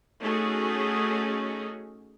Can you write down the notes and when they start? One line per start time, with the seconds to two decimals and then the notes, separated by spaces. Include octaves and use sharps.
0.21 A3 C#4 D#4 F#4 G#4